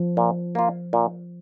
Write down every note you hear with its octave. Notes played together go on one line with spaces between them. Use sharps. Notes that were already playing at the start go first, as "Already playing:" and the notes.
Already playing: F3
A#2
A#3 F4
A#2